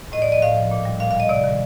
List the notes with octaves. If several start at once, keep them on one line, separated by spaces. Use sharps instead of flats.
A2 D#5
D5
F3 D#5
A2 F5
F3
A#2
G3
A#2 F5
F5
G3 D#5
C3 D5
D#3 G3